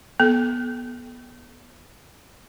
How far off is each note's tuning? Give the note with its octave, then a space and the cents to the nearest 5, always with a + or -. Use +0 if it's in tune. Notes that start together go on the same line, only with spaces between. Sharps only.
B3 -15 A4 -25